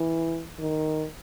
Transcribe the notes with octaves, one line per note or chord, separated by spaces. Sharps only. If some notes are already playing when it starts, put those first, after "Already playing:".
Already playing: E3
D#3